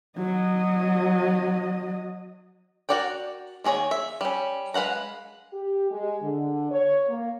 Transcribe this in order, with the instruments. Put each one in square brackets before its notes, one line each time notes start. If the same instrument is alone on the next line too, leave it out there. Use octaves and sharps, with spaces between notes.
[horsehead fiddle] F#3 D#5
[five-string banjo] F#4 A#4 D5 F#5 G5
D#3 A#3 G#4 C#5 A#5
E5
G3 C#4
G#3 B4 F5 F#5 A#5
[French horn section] G4
G#3
D3
C#5
A#3